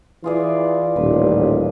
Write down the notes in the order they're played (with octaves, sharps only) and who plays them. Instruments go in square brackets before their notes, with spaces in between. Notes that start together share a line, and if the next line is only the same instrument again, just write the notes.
[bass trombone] E3 [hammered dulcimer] F4 G#4 D5
[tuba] D#1 [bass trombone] A1 [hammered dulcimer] B4